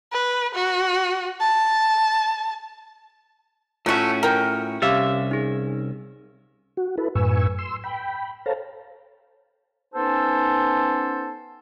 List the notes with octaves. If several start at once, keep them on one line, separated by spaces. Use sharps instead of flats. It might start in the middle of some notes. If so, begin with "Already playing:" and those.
B4
F#4
A5
A2 F#3 A3 C#4 F4 F#4 B6
A#4 G5
C2 C#4 G4 E5 F5 D6
D#4 G#4
F#4
E4 A4 B4
F#2 A2 B4 G#5 C#6 E6
C6 E6
G5 B5
A4 C5 C#5 F5 A5 A#5
B3 C#4 D#4 A4 C5 A5